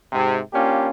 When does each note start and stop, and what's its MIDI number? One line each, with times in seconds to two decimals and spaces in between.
0.13 0.39 44
0.13 0.39 48
0.54 0.88 58
0.54 0.88 61
0.54 0.88 62
0.54 0.88 65
0.54 0.88 67